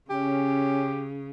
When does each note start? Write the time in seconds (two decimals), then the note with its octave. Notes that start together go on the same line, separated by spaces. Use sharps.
0.10 C#3 C#4 G4